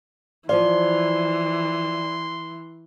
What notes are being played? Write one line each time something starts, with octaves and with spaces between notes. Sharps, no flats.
E3 F3 C5 D5 F5 C6